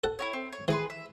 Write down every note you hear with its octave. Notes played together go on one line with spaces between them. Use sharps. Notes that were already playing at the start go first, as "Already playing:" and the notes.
A4 F#5
E4 F#4 C#5
C4
C#5
E3 G#4 B4 C6
E5